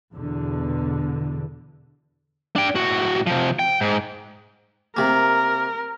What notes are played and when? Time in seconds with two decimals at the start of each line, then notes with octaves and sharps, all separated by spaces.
0.13 E2 B2 D3
2.56 D4 G5
2.75 A2 F#4
3.27 C3 F3
3.59 G5
3.81 G#2
4.97 C3 A#3 A#4